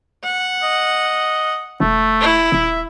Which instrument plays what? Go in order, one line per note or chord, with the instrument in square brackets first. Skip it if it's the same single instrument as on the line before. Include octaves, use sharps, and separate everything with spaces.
[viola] F#5
[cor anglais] D#5
[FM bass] E1 [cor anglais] A3
[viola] E4
[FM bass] D#1 [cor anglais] E5